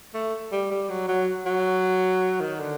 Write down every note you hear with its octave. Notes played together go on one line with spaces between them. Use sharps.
A3
G3
G3
F#3
F#3
F#3
D#3
D3